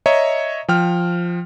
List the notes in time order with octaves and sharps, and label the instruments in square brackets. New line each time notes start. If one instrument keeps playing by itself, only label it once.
[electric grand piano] C#5 D#5 E5 A#5
F3 G5 F6